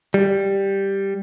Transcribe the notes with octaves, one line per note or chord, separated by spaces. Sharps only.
G3